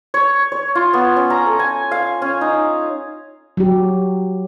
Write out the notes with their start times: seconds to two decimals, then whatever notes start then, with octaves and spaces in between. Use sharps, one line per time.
0.14 C#5
0.52 C#5
0.75 F4
0.93 B3
1.16 C#4
1.30 A#5
1.46 A4
1.59 G#5
1.91 F5
2.22 C#4
2.41 D#4
3.57 F#3 G4